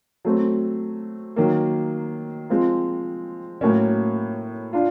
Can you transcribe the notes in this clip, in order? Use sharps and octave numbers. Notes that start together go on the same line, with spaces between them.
F#3 A3 C4
D#3 F#3 A#3
F3 G#3 C4 F4
A2 F#3 A#3 C#4
D4 F4